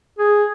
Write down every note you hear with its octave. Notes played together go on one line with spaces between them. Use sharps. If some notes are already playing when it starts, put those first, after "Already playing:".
G#4